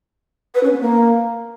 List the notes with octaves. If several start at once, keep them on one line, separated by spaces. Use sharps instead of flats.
B4
C#4
B3
A#3